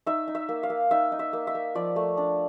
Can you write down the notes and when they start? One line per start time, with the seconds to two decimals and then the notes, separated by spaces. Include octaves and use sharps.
0.06 D#4 E5
0.28 D#4
0.35 E5
0.49 A#3
0.63 F5
0.70 A#3
0.91 D#4 E5
1.12 D#4
1.19 E5
1.33 A#3
1.47 E5
1.55 A#3
1.75 F3 D5
1.96 A3
2.17 D4